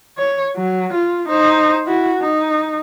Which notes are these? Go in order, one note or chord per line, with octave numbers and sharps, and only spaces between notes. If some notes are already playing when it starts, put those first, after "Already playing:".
C#5
F#3
F4
D#4 C5
E4 F#4
D#4